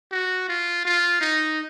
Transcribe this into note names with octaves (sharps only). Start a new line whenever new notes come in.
F#4
F4
F4
D#4